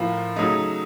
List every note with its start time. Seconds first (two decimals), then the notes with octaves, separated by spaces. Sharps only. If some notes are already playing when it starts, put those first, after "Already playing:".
Already playing: A2 F3 A#3 F4
0.36 C#3 F#3 A3 D#4